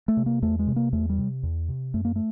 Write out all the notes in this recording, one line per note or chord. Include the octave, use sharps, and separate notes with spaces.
A3
C3
A#3
E2 A3
G#3
C3
A#3
E2 A3
G3
C3
E2
C3
F#2 A3
A#3
A3